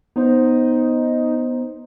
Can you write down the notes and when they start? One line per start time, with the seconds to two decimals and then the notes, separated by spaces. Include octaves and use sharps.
0.16 B3 D#4 C5